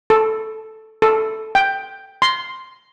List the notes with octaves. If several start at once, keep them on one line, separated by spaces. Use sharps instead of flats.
A4
A4
G5
C6